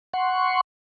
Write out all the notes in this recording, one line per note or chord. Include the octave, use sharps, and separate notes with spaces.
F#5 C6 C#6